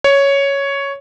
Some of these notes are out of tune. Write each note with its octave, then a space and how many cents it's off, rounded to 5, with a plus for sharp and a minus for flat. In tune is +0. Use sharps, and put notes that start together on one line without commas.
C#5 +5